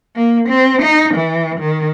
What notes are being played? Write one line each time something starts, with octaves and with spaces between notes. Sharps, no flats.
A#3
C4
D#4
E3
D#3